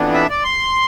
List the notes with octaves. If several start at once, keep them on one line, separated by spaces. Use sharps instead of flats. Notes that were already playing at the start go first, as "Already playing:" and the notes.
Already playing: F2 E3 B3 D4
E5
D5
C6